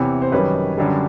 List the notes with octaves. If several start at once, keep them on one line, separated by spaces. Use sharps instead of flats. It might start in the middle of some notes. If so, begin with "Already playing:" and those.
Already playing: E2 C3 E3 C#5
C5
F#2 D#3 G3 B4 C#5
F#2 D3 G3